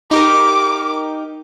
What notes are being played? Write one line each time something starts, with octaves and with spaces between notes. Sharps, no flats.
D#4 G4 A#4 D6